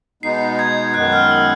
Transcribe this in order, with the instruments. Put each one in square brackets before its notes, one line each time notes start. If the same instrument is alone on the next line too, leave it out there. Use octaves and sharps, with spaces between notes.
[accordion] B2 G#3 B3 D#4 [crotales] C7
[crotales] G#6
[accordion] F#2 D#3 G#3 B3 [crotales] F#6
[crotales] F6
E6